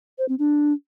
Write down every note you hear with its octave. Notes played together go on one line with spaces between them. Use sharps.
C5
C4
D4